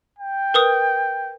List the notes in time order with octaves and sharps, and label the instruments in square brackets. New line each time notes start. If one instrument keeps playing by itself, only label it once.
[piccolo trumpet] G5
[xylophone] A#4 B4 D#6